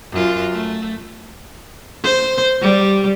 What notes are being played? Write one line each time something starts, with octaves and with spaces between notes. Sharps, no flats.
F#2 F4
A3
C5
G3